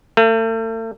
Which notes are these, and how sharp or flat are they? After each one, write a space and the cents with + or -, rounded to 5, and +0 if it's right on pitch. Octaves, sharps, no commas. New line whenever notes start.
A3 +40